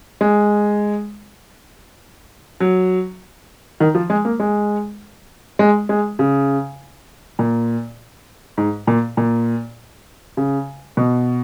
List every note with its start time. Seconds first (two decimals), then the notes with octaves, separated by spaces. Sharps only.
0.21 G#3
2.60 F#3
3.80 D#3
3.95 F3
4.10 G#3
4.25 A#3
4.40 G#3
5.59 G#3
5.89 G#3
6.19 C#3
7.39 A#2
8.58 G#2
8.87 A#2
9.17 A#2
10.37 C#3
10.97 B2